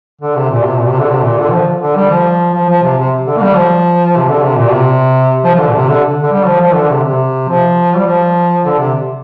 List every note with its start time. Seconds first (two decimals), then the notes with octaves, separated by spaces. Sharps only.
0.21 D3
0.35 C3
0.51 A#2
0.65 C3
0.80 A#2
0.89 C3
0.99 D3
1.09 C3
1.24 A#2
1.38 D3
1.52 F3
1.81 D3
1.96 G3
2.11 F3
2.54 F3
2.69 F3
2.83 C3
2.98 C3
3.27 D3
3.37 A#3
3.41 G3
3.56 F3
4.16 C3
4.29 D3
4.43 C3
4.57 A#2
4.72 C3
5.44 F3
5.55 F3
5.59 D3
5.68 A#2
5.74 C3
5.89 D3
6.22 D3
6.32 G3
6.47 F3
6.61 F3
6.75 D3
6.90 C3
7.05 C3
7.49 F3
7.96 G3
8.07 F3
8.65 D3
8.79 C3